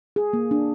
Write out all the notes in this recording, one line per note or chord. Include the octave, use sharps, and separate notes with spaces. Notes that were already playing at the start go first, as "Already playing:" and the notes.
G#4
A#3
D4